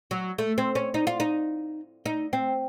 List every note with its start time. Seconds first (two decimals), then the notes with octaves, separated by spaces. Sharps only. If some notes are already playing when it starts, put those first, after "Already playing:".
0.11 F#3
0.38 A3
0.58 C4
0.75 C#4
0.94 D#4
1.07 F4
1.20 D#4
2.06 D#4
2.33 C4